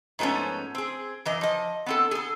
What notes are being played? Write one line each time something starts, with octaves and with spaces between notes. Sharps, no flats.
G#2 F3 A3 B3 C#4
C4 G#4
F#2 E3 D#5
F3 D#5
B3 C4 A4
G#4 A4